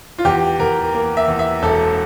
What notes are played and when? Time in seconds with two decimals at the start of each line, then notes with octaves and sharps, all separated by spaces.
0.18 F4
0.25 E2 G4
0.60 E2 A#4
0.94 A#3
1.17 E5
1.28 E2
1.39 E5
1.63 E1 A4